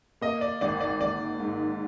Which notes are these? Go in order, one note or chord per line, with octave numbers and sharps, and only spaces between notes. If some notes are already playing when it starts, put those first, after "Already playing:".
A#3 D#5
D5
G#1 D5
D5
G#1 D5
G#2